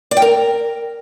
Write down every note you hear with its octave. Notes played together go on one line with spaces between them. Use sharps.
D5
G5
A#4